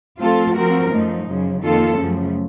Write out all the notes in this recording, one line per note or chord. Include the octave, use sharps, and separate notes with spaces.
F3 A3 C4 F4 A4
F3 C4 F#4 A#4
F#2 F3 A3 D#4
F#2 C#3 F3
F2 D#3 A#3 F4 A4
F#2 C#3 F3 A3